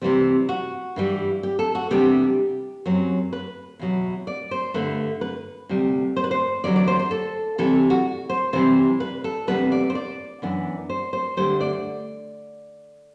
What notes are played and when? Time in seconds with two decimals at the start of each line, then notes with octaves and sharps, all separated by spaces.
0.01 C3 E3 G3 C4
0.49 F#4
0.96 G2 E3 G3
1.43 G4
1.59 A4
1.75 F#4
1.91 E2 C3 G3 B3 D4 G4
2.86 F#2 F#3 C4
3.33 B4
3.79 E2 B2 F#3
4.27 D5
4.51 C5
4.74 G2 D3 A3 B4
5.21 B4
5.69 D2 C3 G3
6.16 C5
6.24 B4
6.31 C5
6.64 E2 D3 F#3 D5
6.76 D5
6.88 C5
6.99 C5
7.11 A4
7.58 C3 E3 G3 A4
7.90 F#4
8.29 C5
8.53 C3 E3 G3 C5
9.00 B4
9.24 A4
9.47 E2 C3 G3 B3 D4 B4
9.72 D5
9.90 C5
9.95 D5
10.42 F#2 E3 B3 D4
10.89 C5
11.13 C5
11.37 D2 D3 G3 C5
11.61 D5